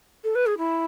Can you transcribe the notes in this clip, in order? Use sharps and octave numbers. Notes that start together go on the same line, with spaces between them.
A4
B4
G#4
E4